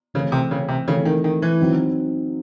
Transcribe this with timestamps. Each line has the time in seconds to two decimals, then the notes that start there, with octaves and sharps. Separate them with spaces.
0.14 C#3 E3 A3 C4
0.32 C3
0.51 C#3
0.68 C3
0.87 C#3 E3 A3 C4
1.05 D#3
1.24 D#3
1.42 E3
1.60 F#3 C4 D#4